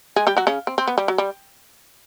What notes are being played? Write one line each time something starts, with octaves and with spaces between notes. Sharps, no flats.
G#3 G#4
G3 G4
F#3 F#4
C#3 C#4
C4
C4
B3
G3
F#3
G3